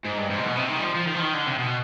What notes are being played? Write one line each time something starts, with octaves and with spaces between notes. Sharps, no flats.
G#2
G2
G#2
C3
B2
C3
D#3
G3
F3
F3
D#3
F3
D#3
D3
C3
B2